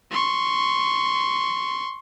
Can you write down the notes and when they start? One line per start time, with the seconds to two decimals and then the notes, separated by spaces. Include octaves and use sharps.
0.11 C6 C#6